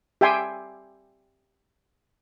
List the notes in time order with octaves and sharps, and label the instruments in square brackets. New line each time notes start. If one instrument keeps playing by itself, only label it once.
[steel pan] G4 E5 G5 G#5 C6